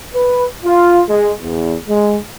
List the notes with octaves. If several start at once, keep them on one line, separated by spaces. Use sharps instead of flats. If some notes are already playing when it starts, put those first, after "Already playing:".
B4
F4
G#3
E2
G#3